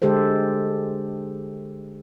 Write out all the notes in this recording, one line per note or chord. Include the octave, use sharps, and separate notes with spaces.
D3 G#3 G4 A4 C5